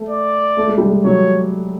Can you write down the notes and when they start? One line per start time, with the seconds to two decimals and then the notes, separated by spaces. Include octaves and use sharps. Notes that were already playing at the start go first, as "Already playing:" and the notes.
Already playing: A3
0.09 D5
0.57 A3
0.67 G#3
0.78 G3
0.88 G#3
1.04 F#3 C#5